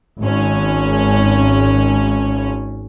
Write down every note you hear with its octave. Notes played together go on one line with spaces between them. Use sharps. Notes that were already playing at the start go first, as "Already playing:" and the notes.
G#1 C#4